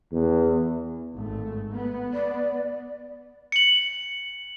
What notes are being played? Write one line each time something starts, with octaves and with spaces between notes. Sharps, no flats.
E2
G#1 A3
B3
D5
C#7 F#7